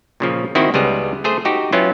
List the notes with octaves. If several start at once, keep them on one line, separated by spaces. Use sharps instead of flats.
A#2 C#3 F3
D#3 C4 E4 F#4 D#5
C#2 G3 B3 G#4
A3 G#4 C5
D#4 F#4 G4
F#3 B3 C#4 E4 F4